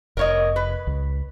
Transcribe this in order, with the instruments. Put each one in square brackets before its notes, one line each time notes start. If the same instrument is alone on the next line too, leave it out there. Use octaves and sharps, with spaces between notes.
[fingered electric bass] F1 [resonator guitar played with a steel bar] A#4 C#5 D#5
[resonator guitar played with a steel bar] B4
[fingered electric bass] C#2